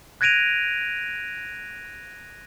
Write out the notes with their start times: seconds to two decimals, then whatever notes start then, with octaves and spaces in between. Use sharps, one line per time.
0.21 F#6 G#6 A#6 D7 D#7 F7